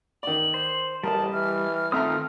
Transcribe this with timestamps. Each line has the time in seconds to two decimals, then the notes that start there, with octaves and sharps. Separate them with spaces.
0.23 D#3 D5 F#7
0.54 C5
1.03 A1 G3 A#4 D#5 A5
1.33 E3 F6
1.92 D#3 A3 C4 F4 E5 A#5 D#6